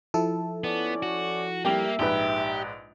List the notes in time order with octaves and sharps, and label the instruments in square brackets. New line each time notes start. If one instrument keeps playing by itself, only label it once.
[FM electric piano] F3 E4 A4
[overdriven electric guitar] B3 [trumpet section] C#4 D5
[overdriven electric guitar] F#4
[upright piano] G3 G4 G5 [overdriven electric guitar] A#3 [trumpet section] E5
[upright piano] A#1 G#2 B4 [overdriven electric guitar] G4